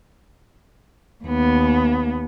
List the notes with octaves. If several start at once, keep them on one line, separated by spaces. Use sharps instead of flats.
D#2 B3